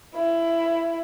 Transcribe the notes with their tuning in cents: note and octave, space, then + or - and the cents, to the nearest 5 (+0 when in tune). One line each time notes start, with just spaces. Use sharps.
E4 +15